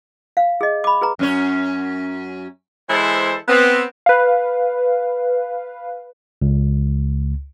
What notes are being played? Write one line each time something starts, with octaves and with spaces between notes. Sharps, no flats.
F5
G#4 D#5
B5 D6
G#4 B4 A#5
F#2 C#4 C#5
E3 G#3 E4 A4 C5
B3 C4
B4 F5
C#2